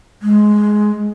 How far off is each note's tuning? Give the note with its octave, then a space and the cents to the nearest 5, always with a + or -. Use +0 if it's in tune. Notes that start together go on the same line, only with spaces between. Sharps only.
G#3 +10